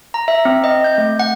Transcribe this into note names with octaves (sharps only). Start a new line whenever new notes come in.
A#5
E5
C4
D#5
G6
A3
F#5